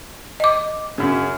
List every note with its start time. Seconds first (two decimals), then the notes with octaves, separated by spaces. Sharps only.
0.40 D#5 D6
0.98 F#2 C#3